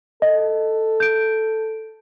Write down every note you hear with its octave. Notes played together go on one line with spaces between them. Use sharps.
A4 D#5
G6 D7